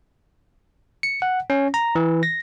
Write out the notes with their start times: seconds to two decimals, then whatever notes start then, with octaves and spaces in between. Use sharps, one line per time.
1.03 C#7
1.22 F#5
1.50 C#4
1.74 A#5
1.95 E3
2.23 A#6